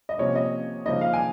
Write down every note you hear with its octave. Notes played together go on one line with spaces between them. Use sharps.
D#5
C3 F3 A#3 C#4 C#5
D#5
C#3 F3 A#3 D#4 D#5
F5
G#5